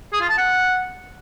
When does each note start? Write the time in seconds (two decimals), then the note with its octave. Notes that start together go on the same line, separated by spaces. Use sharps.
0.13 G#4
0.21 F4
0.30 A5
0.38 F#5